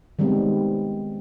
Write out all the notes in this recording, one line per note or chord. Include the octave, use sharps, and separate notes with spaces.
D#3 G3 G#3 B3 C4